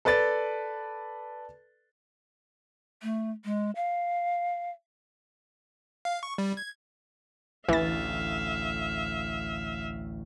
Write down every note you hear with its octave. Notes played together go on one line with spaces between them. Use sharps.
A4 B4 D5 A6
A3
G#3
F5
F5
C#6
G3
G#6
A1 D2 E3 E5 F5 A6